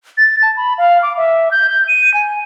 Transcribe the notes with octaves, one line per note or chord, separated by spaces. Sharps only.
A6
A5
B5
F5
D6
E5
G6
G6
D#7
G#5